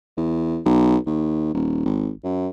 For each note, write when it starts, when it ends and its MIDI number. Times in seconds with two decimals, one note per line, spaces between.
0.17 0.60 40
0.65 0.97 35
1.06 1.51 39
1.54 1.84 27
1.85 2.11 32
2.24 2.49 42